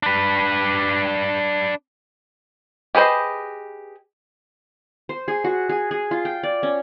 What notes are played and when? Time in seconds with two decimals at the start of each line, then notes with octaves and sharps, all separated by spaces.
0.03 D4 B4
2.95 G4 G#4 B4 C5 D#5
5.09 C5
5.28 G#4
5.44 F#4
5.69 G#4
5.91 G#4
6.11 F4
6.25 G5
6.43 D5
6.63 C#4